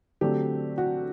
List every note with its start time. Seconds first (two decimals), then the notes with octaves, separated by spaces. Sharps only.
0.21 D3 F#3 A3 C4 G4
0.78 F#4